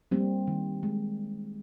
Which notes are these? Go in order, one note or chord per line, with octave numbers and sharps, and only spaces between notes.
G3 A#3 C4
D#3
G#3